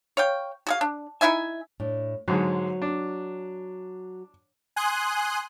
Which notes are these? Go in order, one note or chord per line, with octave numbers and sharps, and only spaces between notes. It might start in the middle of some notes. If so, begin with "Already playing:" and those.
C#5 F5 G5
F#4 G#4 F5
D4
D#4 E4 E5 G#5
A2 D4
G#2 D3 F#3 G#3
D4
G#5 C6 D#6 F#6